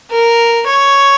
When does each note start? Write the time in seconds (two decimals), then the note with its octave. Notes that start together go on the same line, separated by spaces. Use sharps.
0.11 A#4
0.66 C#5